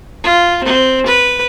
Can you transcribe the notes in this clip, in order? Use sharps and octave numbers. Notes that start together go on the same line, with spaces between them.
F4
C4
B4